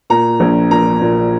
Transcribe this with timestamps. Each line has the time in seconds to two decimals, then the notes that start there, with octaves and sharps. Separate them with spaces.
0.10 A#2 A#5
0.40 A#1
0.71 A#2 A#5
1.02 A#2